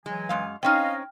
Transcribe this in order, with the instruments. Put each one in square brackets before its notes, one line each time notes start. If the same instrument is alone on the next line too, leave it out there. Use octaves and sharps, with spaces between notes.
[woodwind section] E3 F#3 G#5 [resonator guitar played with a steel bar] G#3
[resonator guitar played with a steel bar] F#2 G#3 F5
[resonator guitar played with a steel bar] C4 C#4 D#4 [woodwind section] D#5 F5 [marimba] G5 F6